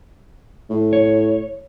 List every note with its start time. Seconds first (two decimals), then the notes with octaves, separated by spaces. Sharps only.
0.70 A2
0.93 C#5